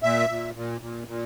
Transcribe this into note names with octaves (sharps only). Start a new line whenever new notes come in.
A#2 E5
A#2
A#2
A#2
A#2